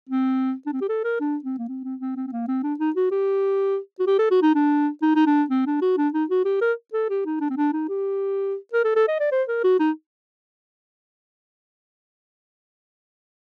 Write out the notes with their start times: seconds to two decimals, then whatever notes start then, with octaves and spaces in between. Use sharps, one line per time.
0.09 C4
0.66 D4
0.73 C4
0.81 G4
0.89 A4
1.04 A#4
1.20 D4
1.44 C4
1.58 A#3
1.68 C4
1.84 C4
2.00 C4
2.16 C4
2.27 C4
2.32 A#3
2.48 C4
2.63 D4
2.79 D#4
2.96 F#4
3.11 G4
3.99 F#4
4.07 G4
4.18 A4
4.31 F#4
4.42 D#4
4.55 D4
5.02 D#4
5.15 D#4
5.26 D4
5.50 C4
5.66 D4
5.82 F#4
5.97 D4
6.14 D#4
6.30 F#4
6.45 G4
6.61 A#4
6.93 A4
7.09 G4
7.25 D#4
7.40 D4
7.50 C4
7.57 D4
7.73 D#4
7.89 G4
8.73 A#4
8.84 A4
8.96 A4
9.08 D#5
9.20 D5
9.32 C5
9.48 A#4
9.64 F#4
9.79 D#4